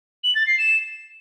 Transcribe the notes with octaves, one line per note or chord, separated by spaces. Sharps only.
F#7
A6
C7
E7